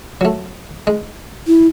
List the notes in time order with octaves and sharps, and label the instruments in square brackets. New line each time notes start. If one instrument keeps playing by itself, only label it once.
[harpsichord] F#3 A3
G#3
[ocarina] E4